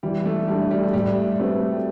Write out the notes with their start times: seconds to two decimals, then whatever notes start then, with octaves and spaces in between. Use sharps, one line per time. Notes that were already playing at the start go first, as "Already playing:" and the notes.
0.03 E3 G3
0.25 A3
0.48 G3 A3 D4 A4
0.71 G3
0.93 A2 G3
1.39 G3 A3 C4 F#4 B4